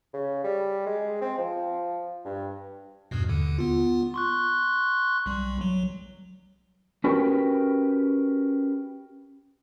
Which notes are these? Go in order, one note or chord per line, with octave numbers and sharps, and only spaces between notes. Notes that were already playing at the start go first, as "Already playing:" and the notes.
C#3
G3
G#3
C4
F3
G2
E2 G2 B2
D#2 D3
B3 F4
C6 C#6 F#6
B1 G3
F#3
C#4 F#4 G4 A#4 B4